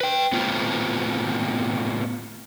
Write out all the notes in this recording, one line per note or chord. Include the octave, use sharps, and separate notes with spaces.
B4 G5
A2 B3 C4 F4